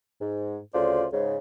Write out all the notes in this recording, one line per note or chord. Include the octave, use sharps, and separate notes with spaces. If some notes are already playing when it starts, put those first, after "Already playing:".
G#2
D2 C#3 F4 C5 D5
G#2 C#3